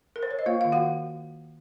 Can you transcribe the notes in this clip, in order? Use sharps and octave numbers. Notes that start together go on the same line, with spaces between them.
A#4
C5
C#5
D#5
A#3 F4 F5
D#3 F5
F#4 F#5